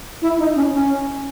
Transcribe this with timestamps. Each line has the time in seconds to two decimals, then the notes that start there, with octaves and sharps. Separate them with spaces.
0.22 E4
0.39 D#4
0.55 C#4
0.73 C#4